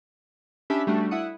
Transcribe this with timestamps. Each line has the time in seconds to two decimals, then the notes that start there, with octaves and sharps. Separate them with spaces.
0.70 C#4 D4 G4 E5 B5
0.87 G3 A3 D4 F#4
1.11 E4 F#5 D#6 C#7